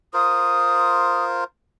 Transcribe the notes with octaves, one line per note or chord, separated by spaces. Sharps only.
F4 A#4 C5 D#6